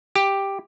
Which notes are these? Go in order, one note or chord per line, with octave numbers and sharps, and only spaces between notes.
G4